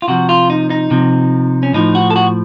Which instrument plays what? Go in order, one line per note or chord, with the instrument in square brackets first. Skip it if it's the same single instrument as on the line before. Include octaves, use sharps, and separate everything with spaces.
[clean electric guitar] F4
C3 F3 F#4
F4
D#4
D#4
C3 F3
C#4
A2 F3 D#4
F#4
A4
F#4